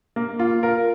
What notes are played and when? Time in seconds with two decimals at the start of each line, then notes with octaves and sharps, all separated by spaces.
0.16 A#3
0.39 F4
0.63 A#4